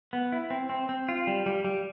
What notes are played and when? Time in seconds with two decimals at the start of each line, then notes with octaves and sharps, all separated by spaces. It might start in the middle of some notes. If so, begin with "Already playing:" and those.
0.13 B3
0.32 E4
0.50 C4
0.69 C4
0.89 C4
1.09 F4
1.27 G3
1.46 G3
1.65 G3